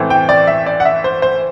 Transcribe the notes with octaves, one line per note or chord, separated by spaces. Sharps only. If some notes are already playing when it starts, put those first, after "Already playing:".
Already playing: A2 E3 A3 C4
G5
D5
E5
D5
F#5
E5
C5
C5